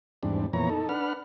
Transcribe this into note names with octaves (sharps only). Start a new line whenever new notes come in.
E2 G#2 G3 C4 D4
F2 A#2 E3 B3 C#5 A#5
D#4 A4
D4 B4 F#5 F6